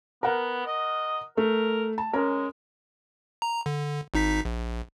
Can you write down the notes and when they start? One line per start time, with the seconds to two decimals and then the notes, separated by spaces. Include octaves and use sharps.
0.23 B3 A#4 F#5
0.66 D#5
1.37 A3 A#4
1.98 A5
2.13 G#3 C#4 A#4
3.42 A#5
3.66 D3
4.14 G#1 D#4 B6
4.45 A#1